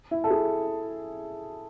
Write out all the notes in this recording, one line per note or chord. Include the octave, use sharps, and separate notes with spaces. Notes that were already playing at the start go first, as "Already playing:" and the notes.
E4
A4
G#4